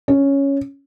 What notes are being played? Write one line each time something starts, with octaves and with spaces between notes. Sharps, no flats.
C#4